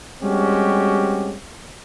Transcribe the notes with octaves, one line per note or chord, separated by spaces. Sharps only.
G3 G#3 C4 C#4 F#4 G4